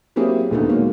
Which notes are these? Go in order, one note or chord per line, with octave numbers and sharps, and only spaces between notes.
F#3 A#3 C4 E4 G4 G#4
D#1 D2 D3 A3 B3 D#4
F#3 G#3 A#3